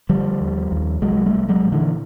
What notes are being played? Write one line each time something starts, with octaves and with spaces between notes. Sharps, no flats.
D3 F3 G3
D#2
D#2
C2 F#3 G#3
G3 A3
C2
F#3 G#3
A#2
D3 E3